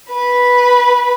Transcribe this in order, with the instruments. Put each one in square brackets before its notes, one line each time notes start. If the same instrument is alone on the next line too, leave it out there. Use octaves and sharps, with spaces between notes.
[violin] B4